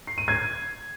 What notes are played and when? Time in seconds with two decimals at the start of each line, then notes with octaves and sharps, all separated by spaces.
0.07 C7
0.18 D#7
0.28 G#6